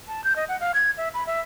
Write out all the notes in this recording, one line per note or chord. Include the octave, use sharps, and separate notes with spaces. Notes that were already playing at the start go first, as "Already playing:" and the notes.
A5
G6
D#5
F#5
F5
G#6
E5
B5
E5